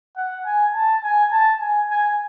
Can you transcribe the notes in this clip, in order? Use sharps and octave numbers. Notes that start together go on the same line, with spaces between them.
F#5
G#5
A5
G#5
A5
G#5
G#5